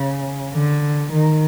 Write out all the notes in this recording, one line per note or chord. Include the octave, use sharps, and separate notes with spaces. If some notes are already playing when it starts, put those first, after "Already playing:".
Already playing: C#3
D3
D#3